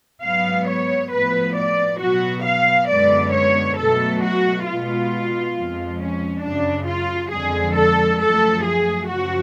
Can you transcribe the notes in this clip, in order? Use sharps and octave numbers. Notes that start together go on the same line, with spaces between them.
G#2 F#3 B3 F5
C#5
A2 F3 B3 B4
D5
B2 F#3 B3 F#4
F5
F#2 D3 G#3 B3 D5
C#5
B2 F#3 A3 A4
F#4
B2 G#3 B3 F4
F2 F3 G#3
C#4
F#2 C#3 F#3 D4
F4
F2 D3 G#3 G#4
A4
F#2 F3 A3 A4
G#4
F#2 C#3 F3 F#4